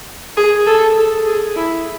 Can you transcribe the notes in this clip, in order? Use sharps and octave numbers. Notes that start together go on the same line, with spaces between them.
G#4
A4
A4
G#4
E4